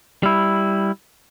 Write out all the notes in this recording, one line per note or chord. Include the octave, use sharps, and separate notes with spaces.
G3 E4